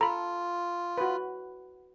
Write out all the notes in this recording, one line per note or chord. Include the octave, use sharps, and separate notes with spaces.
F4 A4 A#5 B5
F#4 B4